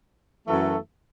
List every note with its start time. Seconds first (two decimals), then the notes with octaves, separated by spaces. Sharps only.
0.47 F#2 E3 A3 F#4 A4